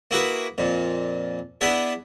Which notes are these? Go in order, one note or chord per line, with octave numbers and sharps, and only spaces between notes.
A#3 E4 F#4 G#4 B4
F2 A#2
B3 D4 E4 G#4 B4